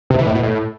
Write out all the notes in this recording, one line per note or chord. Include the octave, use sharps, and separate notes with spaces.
C3
E3
A2
B2
A2